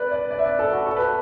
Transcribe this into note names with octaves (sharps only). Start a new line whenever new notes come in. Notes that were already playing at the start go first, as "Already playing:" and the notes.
Already playing: B4 D5
D5
D5
E5
D5
A4
F#4
A4
B4